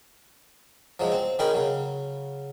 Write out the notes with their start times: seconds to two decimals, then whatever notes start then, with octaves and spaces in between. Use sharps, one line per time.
1.00 F3 F#3 G#3
1.12 C4
1.39 D#3 C#4 G#4 G5 G#5 B5
1.54 C#3 F#3